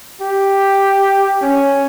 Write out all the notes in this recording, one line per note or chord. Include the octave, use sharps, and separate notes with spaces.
G4
C#4